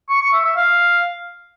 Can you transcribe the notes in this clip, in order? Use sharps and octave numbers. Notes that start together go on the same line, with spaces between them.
C#6
C#6
E5
E5
F5